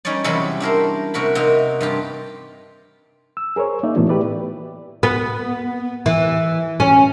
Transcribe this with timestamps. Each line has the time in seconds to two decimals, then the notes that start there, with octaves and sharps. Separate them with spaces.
0.05 G3 C#4 D#4 C#5 D5
0.24 E2 C3 F#3 G3 C#4 B5
0.60 D4 E4 A#4 C5
1.14 C3 F#4 A#4 B5
1.35 C3 A#3 C4 D#4
1.81 G2 F4 G4
3.37 E6
3.56 G#4 A#4 C5 C#5
3.83 A#3 D#4 D5 E5
3.95 A2 E3 A3 B3 E4 F#4
4.09 G4 B4 D5
5.03 B3
6.06 E3
6.80 C#4